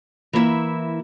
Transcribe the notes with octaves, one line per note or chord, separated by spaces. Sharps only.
E3 A#3 E4 E5